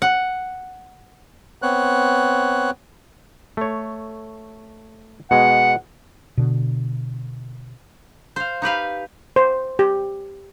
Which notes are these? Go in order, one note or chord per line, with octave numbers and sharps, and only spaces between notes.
F#5
B3 C4 C#5 F#6
A3 C#5
B2 G#3 F#5
B2 D3
C5 F5
D#4 G4 B4 F5
C5
G4